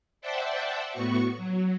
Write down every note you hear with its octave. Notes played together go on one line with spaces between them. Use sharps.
C5 D5 E5 F#5 G5 A5
A2 B3 F#4 C#6
F#3